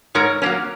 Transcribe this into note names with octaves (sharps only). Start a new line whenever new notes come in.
G#2 A#4 C#5
F#3 A#3 C#4